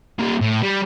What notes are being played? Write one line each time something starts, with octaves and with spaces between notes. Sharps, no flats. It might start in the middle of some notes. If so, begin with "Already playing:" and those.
G3 A#3
A2
G3